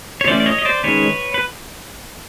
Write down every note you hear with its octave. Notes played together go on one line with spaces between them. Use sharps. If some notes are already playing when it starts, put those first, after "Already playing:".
C#5
E3 A3 C#4 C5 D5
D5
C#5 D#5
D#5
C5 D5
D#3 G#3 C#4 B4 C#5
B4